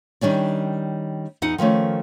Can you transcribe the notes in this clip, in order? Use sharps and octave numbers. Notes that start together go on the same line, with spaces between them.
D#3 G3 C#4 D4
E2 D#4 F#5
D#3 F3 A3 C#4